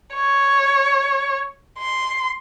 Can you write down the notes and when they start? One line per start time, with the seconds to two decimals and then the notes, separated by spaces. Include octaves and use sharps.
0.15 C#5
1.78 C6